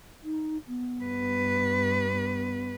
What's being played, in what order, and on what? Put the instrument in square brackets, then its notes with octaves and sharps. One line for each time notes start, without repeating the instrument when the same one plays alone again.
[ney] D#4
B3
[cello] G2 B4
[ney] B3